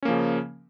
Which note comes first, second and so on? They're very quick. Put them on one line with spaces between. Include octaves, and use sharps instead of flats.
C#4 A#3 F3 C#3